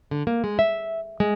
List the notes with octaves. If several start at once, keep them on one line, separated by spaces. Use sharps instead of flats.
D3
A#3
G#3
E5
G#3